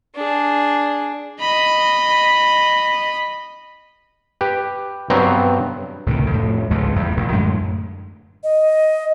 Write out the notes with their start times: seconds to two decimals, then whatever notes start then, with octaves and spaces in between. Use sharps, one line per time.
0.16 D4 G#4
1.41 D#5 B5
4.41 G4 B4
5.10 G2 F#3 B3 C4 C5 A#5
6.06 C#2 A2 C3 D#3
6.31 F2 A2
6.71 C#2 G#2 G#3 A3
6.96 E2 G3
7.17 A#1
7.32 F#2 A2 D3 G#3
8.44 D#5